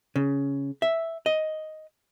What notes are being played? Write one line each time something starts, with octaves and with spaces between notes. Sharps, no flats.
C#3
E5
D#5